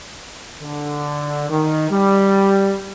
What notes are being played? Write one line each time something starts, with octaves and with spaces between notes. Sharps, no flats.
D3
D#3
G3